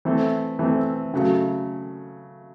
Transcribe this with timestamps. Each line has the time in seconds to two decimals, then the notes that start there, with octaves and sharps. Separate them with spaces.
0.05 E3 A3 C4
0.59 E3 A3 C4
1.14 C#3 F#3 A3